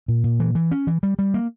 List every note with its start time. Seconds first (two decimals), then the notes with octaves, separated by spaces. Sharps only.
0.08 A#2
0.24 A#2
0.40 E3
0.55 E3
0.71 C#4
0.87 E3
1.03 G3
1.19 G3
1.34 A#3